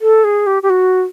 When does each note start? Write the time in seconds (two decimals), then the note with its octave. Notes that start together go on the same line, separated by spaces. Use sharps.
0.01 A4
0.24 G#4
0.47 G4
0.63 G4
0.70 F#4